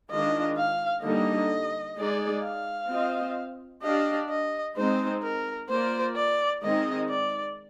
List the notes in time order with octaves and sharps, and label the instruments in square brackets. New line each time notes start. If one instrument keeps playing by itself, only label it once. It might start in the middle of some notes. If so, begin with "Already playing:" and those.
[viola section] D#3 G#3 D4 F4 [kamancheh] D#5
[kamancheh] F5
[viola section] D3 G3 A#3 D#4 [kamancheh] D#5
[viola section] G#3 D#4 G#4 D5
[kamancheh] F5
[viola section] C4 F4 C5 D#5
[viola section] D4 G4 D5 F5 [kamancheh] D#5
[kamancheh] D#5
[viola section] G#3 C4 D#4 [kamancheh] C5
[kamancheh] A#4
[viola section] A#3 F4 A#4 D5 [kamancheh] C5
[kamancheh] D5
[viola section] D#3 G#3 C4 D#4 [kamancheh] D#5
[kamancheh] D5